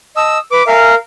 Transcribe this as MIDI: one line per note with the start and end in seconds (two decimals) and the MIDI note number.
0.17 0.38 75
0.17 0.38 81
0.17 0.38 87
0.17 0.38 88
0.51 0.64 71
0.51 0.63 86
0.67 0.95 70
0.67 0.92 76
0.67 0.95 77
0.67 0.92 80